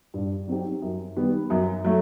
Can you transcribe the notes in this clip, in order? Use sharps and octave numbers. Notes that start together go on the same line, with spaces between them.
G2
F#3 C4 D#4 G4
F#2
D#3 G3 B3
F#2
F#3 A3